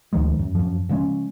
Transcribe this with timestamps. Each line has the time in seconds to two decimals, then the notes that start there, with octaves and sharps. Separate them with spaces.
0.13 D2 D#3 F3 G#3
0.39 F#2
0.55 F#2 F3
0.89 C#3 F3 G#3 C#4